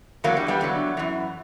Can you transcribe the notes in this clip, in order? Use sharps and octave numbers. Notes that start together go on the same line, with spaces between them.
E2 D3 F#3 A#3
G3
G3 B3
E2 D3 F#3
F#2 E3